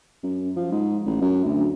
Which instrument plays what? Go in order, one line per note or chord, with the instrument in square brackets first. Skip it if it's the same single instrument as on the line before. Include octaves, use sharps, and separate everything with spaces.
[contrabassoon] F#2
F3
G#2
A1
F#2
D2